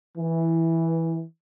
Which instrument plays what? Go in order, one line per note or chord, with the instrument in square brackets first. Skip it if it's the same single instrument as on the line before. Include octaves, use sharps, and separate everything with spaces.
[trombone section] E3